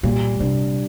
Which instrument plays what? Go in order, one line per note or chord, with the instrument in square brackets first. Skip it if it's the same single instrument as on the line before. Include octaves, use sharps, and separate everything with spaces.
[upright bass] A#2 [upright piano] G3
[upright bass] C3 [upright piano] D4